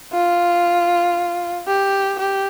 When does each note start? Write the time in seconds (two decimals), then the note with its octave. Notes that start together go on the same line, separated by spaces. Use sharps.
0.13 F4
1.68 G4
2.19 G4